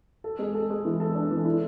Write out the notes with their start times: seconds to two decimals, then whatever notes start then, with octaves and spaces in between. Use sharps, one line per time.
0.24 A4
0.39 G#3
0.55 A4
0.70 G#3
0.85 E3
1.00 A4
1.15 D4
1.31 E3
1.45 E4